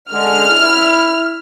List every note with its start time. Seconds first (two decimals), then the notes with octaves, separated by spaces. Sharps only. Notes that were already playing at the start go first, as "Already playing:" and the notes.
0.12 D3 G#3 F6
0.50 E4